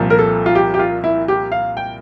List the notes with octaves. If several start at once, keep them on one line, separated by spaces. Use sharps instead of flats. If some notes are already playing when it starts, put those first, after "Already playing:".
Already playing: C2 A#2 F3
A#4
A4
F4
G4
G4
F4
E4
G4
F5
G5